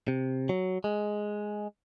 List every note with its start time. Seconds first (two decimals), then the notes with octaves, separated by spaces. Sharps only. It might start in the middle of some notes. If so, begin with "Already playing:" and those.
0.08 C3
0.49 F#3
0.84 G#3